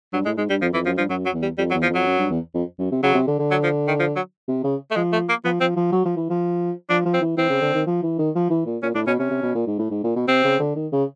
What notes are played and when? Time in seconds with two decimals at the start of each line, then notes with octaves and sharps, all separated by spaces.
0.13 G2 F#3
0.25 A2 G#3
0.38 G#2 G#3
0.50 G2 G3
0.62 F2 F3
0.74 F2 E3
0.85 F#2 F3
0.98 G2 F3
1.09 F#2 F#3
1.26 F#3
1.33 E2
1.42 G3
1.58 F2 G3
1.70 F#3
1.74 E2
1.82 F3
1.90 F2 F#3
2.06 F#2
2.19 G2
2.30 E2
2.55 F2
2.79 F#2
2.92 C3
3.03 C#3 F#3
3.15 C3
3.28 D3
3.39 D3
3.51 F#3
3.63 F3
3.88 D#3
4.00 F3
4.16 F#3
4.48 C3
4.64 C#3
4.91 A3
4.96 F3 G#3
5.13 A3
5.29 A#3
5.44 F3 B3
5.61 F3 C4
5.76 F3
5.92 F#3
6.05 F3
6.17 E3
6.30 F3
6.90 F3 D4
7.06 F3
7.14 C4
7.21 E3
7.37 E3 C4
7.50 C#3
7.62 D3
7.75 D#3
7.87 F3
8.03 E3
8.19 D#3
8.35 F3
8.50 E3
8.66 A#2
8.83 A#2 C#4
8.95 A2 D4
9.07 B2 C#4
9.19 C3 C#4
9.31 C3
9.43 B2
9.55 A#2
9.67 G#2
9.79 A2
9.91 G#2
10.04 A#2
10.16 B2
10.28 C3 C4
10.44 C#3
10.60 D3
10.76 D#3
10.92 C#3